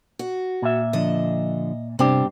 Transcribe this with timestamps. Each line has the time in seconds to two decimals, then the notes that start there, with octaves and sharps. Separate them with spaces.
0.19 F#4
0.62 A#2 E5
0.93 D3 F3 D4 D#5
1.99 G2 C3 C4 D4 G4